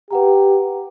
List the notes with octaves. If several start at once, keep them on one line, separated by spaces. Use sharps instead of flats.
G4 B4 F#5 A#5